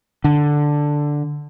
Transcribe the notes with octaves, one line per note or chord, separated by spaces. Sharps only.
D3